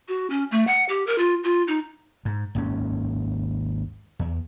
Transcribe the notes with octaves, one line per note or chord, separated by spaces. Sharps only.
F#4
C#4
A3
F#5
G4
A#4
F4
F4
D#4
G#2
G#1 D#2 G#2 C#4
E2